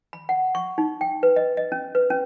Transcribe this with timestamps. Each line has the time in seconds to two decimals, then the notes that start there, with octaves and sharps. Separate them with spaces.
0.13 B5
0.29 F#5
0.55 C#6
0.78 D#4
1.01 G5
1.23 B4
1.36 D#5
1.57 D#5
1.72 C#4
1.95 B4
2.10 C#4